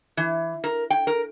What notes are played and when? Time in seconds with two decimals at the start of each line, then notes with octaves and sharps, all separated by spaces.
0.17 E3
0.64 A#4
0.90 G5
1.07 A#4